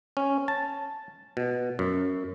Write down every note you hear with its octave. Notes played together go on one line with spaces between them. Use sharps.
C#4
A5
B2
F#2